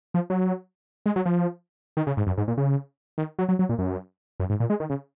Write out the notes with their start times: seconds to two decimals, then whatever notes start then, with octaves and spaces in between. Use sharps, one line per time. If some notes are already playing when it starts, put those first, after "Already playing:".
0.14 F3
0.30 F#3
1.06 G#3
1.16 F#3
1.26 F3
1.97 D#3
2.07 C#3
2.17 G#2
2.27 F#2
2.38 G#2
2.48 A#2
2.57 C#3
3.18 D#3
3.39 F#3
3.49 F#3
3.59 F#3
3.69 A#2
3.79 F#2
4.40 F#2
4.50 G#2
4.60 A#2
4.70 G#3
4.80 D#3
4.90 C#3